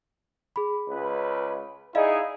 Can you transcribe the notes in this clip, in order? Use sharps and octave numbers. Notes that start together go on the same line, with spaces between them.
G#4 B5
C#2 B4
D#4 E4 G#4 D5 D#5 F5